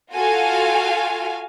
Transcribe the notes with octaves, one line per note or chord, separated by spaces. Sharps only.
F4 F#4 A4 F5 G#5